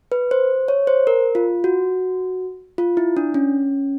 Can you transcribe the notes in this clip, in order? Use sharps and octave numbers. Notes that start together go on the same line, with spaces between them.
B4
C5
C#5
C5
A#4
F4
F#4
F4
E4
D4
C#4